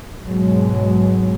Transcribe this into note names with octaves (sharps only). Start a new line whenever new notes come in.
G#2 B2 F#3 G#3